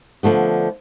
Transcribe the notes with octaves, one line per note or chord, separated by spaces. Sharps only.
D3 F3 A3 B3